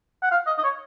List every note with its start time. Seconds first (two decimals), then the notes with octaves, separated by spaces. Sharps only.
0.23 F#5
0.31 F5
0.47 D#5
0.58 D#5
0.64 C#5